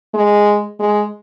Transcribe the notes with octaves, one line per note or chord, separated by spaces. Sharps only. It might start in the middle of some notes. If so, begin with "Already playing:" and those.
G#3
G#3